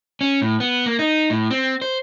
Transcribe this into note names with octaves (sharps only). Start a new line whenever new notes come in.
C#4
A2
B3
A#3
D#4
A2
C4
C5